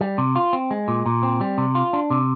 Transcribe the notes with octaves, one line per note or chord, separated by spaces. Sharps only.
G3
C3
F4
C4
G#3
A#2
A#2
C4
G3
C3
F4
D4
C3